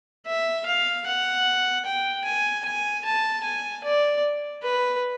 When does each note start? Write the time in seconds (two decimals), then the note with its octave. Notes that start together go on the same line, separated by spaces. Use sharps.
0.26 E5
0.65 F5
1.06 F#5
1.85 G5
2.25 G#5
2.65 G#5
3.05 A5
3.43 G#5
3.84 D5
4.62 B4